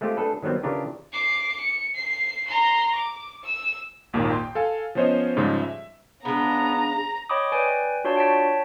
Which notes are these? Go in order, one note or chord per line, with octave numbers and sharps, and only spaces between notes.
G#3 A3 C4 F4 G4
A3 D4 G#4 A4 B4
D#3 F#3 G3 B3 C4
C#3 E3 D4 F4 G4 A#4
D6 C7
C#7
C7
A#5 C6
D6
E6
G#1 D#2 A#2 D#3
G5 C6
A4 F5 G#5
F3 B3 C#4 C5 C#5 D#5
G#2 C#3 F3 G3 G#3
E5
C#3 G#3 B3 D4 A#5
C#5 D#5 G5 B5 D6 D#6
B4 D5 G5 G#5
D4 F4 F#4 C#5 D5 A5
C#5 G5 A5 B6